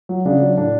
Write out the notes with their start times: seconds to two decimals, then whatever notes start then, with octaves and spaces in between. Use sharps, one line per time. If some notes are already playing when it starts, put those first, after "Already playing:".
0.09 F#3
0.25 C#3 D4
0.41 F#3
0.58 A2 D4